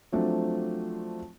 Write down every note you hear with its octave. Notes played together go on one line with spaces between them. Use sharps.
F3 F#3 A3 C4 D4